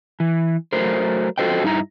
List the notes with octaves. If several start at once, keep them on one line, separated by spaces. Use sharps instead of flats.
E3
F#3 A3 A#4 C5
F4 F#4 A4 C5 D#5 G5
G2 D#4 E4 A#5